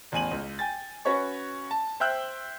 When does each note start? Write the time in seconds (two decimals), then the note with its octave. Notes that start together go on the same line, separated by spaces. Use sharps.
0.12 A1 E2 G#5 D#7 F#7
0.31 C#2
0.59 G5 G#5 A6
1.05 C#4 F#4 B4 C#5 C#6
1.71 A5
2.00 C5 E5 G5 E6 F#6 G6